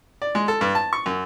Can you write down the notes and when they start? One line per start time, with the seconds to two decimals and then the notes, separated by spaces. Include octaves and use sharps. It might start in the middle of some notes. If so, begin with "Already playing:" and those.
0.22 D5
0.35 G#3
0.48 A4
0.61 G2
0.75 A5
0.93 C#6
1.06 F#2